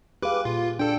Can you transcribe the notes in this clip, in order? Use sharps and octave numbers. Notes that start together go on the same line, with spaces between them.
G4 G#4 B4 F5 D6
A#2 F4
D4 A4 G5